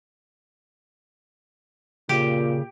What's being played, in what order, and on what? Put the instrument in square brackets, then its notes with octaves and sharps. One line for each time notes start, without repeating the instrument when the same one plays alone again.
[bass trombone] A#2 [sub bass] C#3 [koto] G4